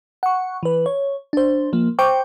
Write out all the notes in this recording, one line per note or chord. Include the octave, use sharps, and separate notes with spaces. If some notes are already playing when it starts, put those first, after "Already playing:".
F#5 C#6
E3 B4
C#5
D4 C5
F3 A#3
C5 G5 C#6 D6